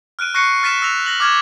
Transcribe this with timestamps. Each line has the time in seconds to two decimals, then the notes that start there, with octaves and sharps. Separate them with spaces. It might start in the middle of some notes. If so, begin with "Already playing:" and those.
0.19 F6 F#6 D7 D#7
0.34 C#6 F#6 A#6 C7 C#7 D#7
0.63 F6 A6 B6 D#7 E7
0.82 E6 A#6 F7
1.06 A#6 F#7
1.20 D6 F6 G#6 A#6 E7